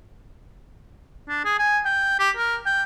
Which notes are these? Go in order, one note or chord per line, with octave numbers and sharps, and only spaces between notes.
D4
G#4
G#5
G5
G4
A#4
G5